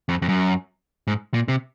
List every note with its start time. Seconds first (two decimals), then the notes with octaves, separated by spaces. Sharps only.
0.09 F2
0.22 F2
0.29 F#2
1.07 G#2
1.34 A#2
1.48 C3